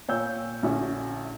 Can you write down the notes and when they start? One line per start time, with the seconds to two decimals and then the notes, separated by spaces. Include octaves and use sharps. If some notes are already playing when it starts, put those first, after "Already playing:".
0.09 A#2 C#5 G5 G#5 E6 G6
0.63 A#1 D3 C#4 E4 F#4 G#5